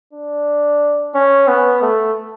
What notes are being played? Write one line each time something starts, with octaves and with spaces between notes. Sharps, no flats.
D4
C#4
B3
A3